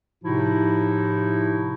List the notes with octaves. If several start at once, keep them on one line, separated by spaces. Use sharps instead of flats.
A2 C3 F3 D#4 E4 F#4